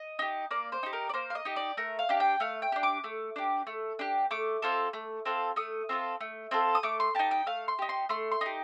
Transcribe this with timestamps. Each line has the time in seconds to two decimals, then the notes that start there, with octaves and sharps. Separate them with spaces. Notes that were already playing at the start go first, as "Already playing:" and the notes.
Already playing: D#5
0.19 D#4 G4
0.51 A#3 D5
0.72 C5
0.83 D#4 G4
0.93 A#4
1.09 D5
1.14 A#3 C5
1.30 F5
1.35 D#5
1.45 D#4 G4
1.56 D5
1.77 A3 A#4
1.99 F5
2.09 D4 G4
2.20 G5
2.40 A3 F5
2.62 G5
2.72 D4 G4
2.83 D6
3.04 A3
3.36 D4 G4
3.67 A3
3.99 D4 G4
4.31 A3 D6
4.62 C4 F4 A4
4.93 A3
5.25 C4 F4 A4
5.56 A3 D#6
5.89 C4 F4 A4
6.21 A3
6.51 C4 F4 A4
6.75 D#6
6.83 A3 D6
7.00 C6
7.15 D#4 G4 A5
7.31 G5
7.46 A3 F5
7.68 C6
7.79 D#4 G4
7.89 C6
8.09 A3 C6
8.32 C6
8.41 D#4 G4